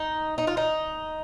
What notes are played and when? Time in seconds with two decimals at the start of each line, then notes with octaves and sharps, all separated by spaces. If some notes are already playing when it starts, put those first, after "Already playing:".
Already playing: D#4
0.38 D#4
0.47 F4
0.57 D#4